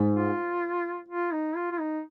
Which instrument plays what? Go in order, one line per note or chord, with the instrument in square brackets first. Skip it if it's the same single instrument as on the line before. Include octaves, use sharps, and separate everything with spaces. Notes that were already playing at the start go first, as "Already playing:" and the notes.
Already playing: [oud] G#2
[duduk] F4
F4
D#4
F4
F4
D#4